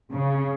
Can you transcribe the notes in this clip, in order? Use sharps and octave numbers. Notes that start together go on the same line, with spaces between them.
C#3